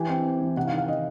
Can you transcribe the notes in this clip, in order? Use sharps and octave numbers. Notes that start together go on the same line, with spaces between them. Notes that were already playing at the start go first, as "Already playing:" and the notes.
Already playing: E3 G4 G#5
C4 G5
C4
E3
C3 F#5
F5
D#3
F5
D#3 D#5